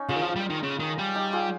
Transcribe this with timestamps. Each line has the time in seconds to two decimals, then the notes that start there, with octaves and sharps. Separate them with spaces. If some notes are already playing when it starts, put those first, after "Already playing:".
Already playing: C#4 D#4
0.09 C#3 F4 G#4
0.16 D#3
0.22 F3
0.36 G3
0.50 D#3
0.63 C#3
0.79 D#3
0.98 G3
1.15 D#4 G4
1.33 F4 G#4